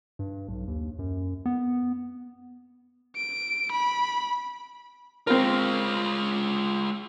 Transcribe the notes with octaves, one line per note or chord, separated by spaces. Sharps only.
G2
B1
D#2
F#2
B3
D7
B5
G#3 C4 F4 A#4